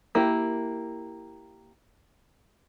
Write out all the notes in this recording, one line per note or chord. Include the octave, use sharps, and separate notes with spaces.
A#3 E4 G4